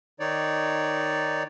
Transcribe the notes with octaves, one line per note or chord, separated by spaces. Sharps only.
D#3 D#4 C#5 D5